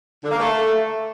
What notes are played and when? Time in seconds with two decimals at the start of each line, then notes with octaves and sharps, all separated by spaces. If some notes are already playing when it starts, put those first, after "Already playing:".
0.23 D3
0.31 A#3
0.39 A3